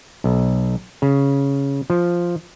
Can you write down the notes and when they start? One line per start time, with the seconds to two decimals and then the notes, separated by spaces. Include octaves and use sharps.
0.24 B1
1.02 C#3
1.90 F3